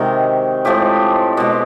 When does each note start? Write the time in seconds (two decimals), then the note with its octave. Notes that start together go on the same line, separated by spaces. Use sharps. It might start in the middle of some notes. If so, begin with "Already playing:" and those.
Already playing: C3 D#3 G#3 F#4
0.65 A2 F3 G#3 G4
1.37 B2 G#3